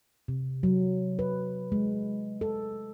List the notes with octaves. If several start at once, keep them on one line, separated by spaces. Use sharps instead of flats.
C3
F#3
B4
G#3
A4